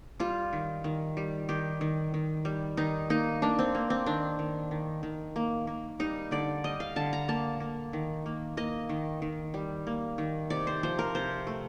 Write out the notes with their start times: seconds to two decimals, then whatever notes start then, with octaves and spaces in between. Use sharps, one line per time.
0.20 G3 F4
0.53 D#3
0.84 D#3
1.17 G3
1.49 D#3 G4
1.81 D#3
2.14 D#3
2.45 G3
2.77 D#3 D#4
3.10 A#3 D#4
3.42 A#3 D4
3.59 C4
3.75 A#3
3.90 C4
4.06 D#3 D4
4.39 D#3
4.71 D#3
5.03 D#3
5.36 A#3
5.67 A#3
5.99 G3 D#4
6.31 D3 D5
6.64 G3 D#5
6.80 F5
6.96 D3 A5
7.13 A#5
7.28 A#3 A5
7.60 A#3
7.93 D#3
8.26 A#3
8.57 A#3 D#5
8.89 D#3
9.22 D#3
9.54 G3
9.87 A#3
10.18 D#3
10.50 C3 D5
10.67 C5
10.83 F3 C5
10.99 A#4
11.15 C3 C5
11.47 A3